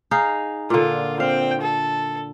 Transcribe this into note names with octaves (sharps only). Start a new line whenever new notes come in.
D#4 G#4 F5
A#2 D3 F4
C4 F5 G5
A4